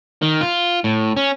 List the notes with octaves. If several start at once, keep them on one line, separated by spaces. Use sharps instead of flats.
D#3
F4
A2
C#4